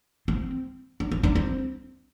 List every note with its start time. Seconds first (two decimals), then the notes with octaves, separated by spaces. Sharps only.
0.28 C4
1.00 D4
1.12 C4
1.23 D4
1.35 C4